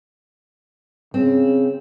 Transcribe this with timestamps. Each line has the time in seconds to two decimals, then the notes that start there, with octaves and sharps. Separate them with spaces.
1.14 C#3 C4